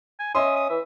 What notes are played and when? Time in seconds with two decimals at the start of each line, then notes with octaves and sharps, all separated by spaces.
0.20 G#5
0.35 C#4 D#5 E5 C6 D#6
0.56 D#6
0.69 E3 E5